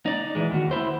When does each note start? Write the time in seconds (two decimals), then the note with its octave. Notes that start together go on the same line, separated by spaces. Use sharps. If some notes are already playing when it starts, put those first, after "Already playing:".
0.06 D#4 D5
0.35 E3 G#3
0.51 D#2 F#4
0.71 E4 C5